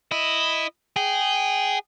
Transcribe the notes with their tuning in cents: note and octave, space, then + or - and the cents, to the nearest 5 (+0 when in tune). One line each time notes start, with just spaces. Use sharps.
E4 +0 D#5 +0
G#4 -10 G5 -20